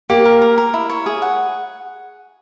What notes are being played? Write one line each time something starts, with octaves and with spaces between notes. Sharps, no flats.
A#3 G4
A#4
A#4
A#4
E4
C#5
G#4
F#5